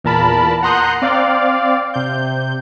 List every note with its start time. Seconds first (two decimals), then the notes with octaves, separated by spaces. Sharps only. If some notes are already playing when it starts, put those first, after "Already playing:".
0.04 E2 A#2 A#4 A5 B5
0.63 F#5 A#5 C6 D#6 F#6 G6
1.02 C4 D5 F5
1.94 C3 G6